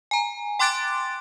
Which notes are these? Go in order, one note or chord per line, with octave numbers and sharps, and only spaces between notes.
G#5 A#5
G5 C6 D6 F#6 A6 D7